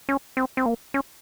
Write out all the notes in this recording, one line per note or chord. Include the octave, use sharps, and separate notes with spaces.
C#4
C4
C4
A#3
C#4